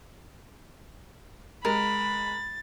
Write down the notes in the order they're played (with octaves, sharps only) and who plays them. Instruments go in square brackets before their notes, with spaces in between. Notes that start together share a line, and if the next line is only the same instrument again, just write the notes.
[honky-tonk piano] G#3 [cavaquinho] A#4 [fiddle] B5 [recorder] A6